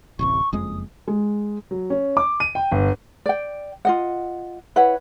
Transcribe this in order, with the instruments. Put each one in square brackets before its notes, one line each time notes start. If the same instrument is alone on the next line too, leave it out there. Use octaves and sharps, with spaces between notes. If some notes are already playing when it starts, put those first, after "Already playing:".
[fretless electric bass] D1 A1 C3 [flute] C#6
[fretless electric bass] F#1 F2 G#3 [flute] D#6
[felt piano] G#3
[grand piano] F#3
C#4
D6
D#7
G5
G1
[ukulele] D5 G5
F4 D#5 F#5
E4 B4 C#5 F#5